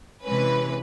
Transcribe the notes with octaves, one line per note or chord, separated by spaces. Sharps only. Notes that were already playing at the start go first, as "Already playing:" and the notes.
C3 E3 G#3 C#4 B4